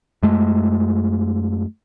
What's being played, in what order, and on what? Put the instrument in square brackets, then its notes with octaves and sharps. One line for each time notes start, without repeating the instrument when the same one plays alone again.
[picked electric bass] F#2 G#3 A3